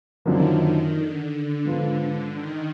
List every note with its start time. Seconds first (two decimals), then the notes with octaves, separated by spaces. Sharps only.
0.25 F#2 D3 D#3 F3 A#3
0.95 D3
1.65 G#2 F3 B3 F4
2.35 D#3